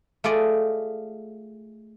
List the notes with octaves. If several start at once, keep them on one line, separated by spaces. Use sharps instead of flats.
A3 F4 G#4 D5 D#5